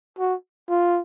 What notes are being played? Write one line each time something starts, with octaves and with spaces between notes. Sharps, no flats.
F#4
F4